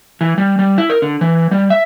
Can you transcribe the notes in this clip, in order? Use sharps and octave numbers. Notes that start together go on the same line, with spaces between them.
E3
G3
G3
E4
A#4
D3
E3
G3
E5